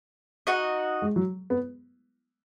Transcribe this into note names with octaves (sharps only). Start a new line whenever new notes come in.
D#4 F#4 D#5
G#3
F#3
B3